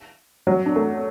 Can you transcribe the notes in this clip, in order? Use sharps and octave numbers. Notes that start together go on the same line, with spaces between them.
F#3
D4
A3